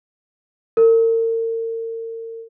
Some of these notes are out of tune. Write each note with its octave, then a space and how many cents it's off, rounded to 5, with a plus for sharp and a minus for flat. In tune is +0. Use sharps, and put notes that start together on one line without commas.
A#4 -40